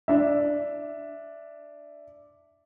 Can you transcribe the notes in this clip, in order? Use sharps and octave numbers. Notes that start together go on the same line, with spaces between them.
D4 E5